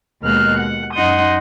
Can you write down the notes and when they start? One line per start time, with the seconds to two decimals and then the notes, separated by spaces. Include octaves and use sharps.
0.21 D#2 B2 G#3 A#3 F6 F#6
0.58 F#5
0.94 F#2 D#4 F#5 C6 D#6 G6